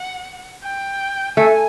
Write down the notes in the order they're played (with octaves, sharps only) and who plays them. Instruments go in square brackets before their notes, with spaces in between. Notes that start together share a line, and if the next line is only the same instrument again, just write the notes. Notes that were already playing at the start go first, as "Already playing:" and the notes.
Already playing: [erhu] F#5
G5
[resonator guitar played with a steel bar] A3 [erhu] G#5